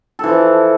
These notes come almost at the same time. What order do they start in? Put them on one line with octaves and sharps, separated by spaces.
A4 E3 F3